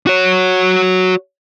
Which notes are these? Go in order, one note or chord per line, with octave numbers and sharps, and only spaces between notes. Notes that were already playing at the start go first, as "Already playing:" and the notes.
F#4 C#5